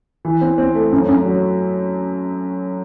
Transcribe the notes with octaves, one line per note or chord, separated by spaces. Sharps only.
E3
C4
C4
A3
F#2
F#2
F#3